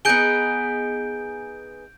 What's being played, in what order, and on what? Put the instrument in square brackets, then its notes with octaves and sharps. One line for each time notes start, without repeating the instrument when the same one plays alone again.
[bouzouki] B3 D#4 G#4 [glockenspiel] G6 D7 G7